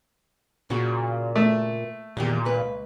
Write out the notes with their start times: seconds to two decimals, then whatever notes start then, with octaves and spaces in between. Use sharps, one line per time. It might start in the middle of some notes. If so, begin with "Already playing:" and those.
0.70 A#2 C#3 F#4
1.35 A3
2.17 E2 A#2 D#3 G4
2.45 C#2 B4